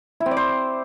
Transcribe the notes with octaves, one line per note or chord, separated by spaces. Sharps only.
E4
C4
D5
C5